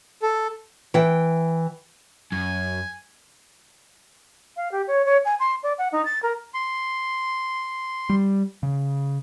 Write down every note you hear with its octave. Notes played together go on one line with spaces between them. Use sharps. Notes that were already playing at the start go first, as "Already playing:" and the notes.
A4
E3 G5
F#2 G#5
F5
G4
C#5
C#5
G#5
C6
D5
F#5
D#4
A6
A#4
C6
G3
C#3